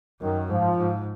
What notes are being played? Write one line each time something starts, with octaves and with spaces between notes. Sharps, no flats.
F#2 D#3
G#2 F3
G#2